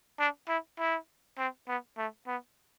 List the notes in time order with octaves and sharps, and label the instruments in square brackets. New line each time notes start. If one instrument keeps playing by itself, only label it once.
[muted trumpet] D4
E4
E4
C4
B3
A3
B3